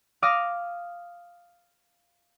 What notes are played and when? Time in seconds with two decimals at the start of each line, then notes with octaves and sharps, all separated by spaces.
0.22 F5 D6 D#6 F6 A#6